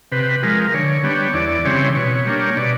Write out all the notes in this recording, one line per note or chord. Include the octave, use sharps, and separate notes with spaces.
C3 B4
F3 G#3 A#4
D3 C#5
G3 B3 D4
E2 D5
C#3 E3 G3 C4 C#5
B2 C#5
G3 A#3 D4
B2 D5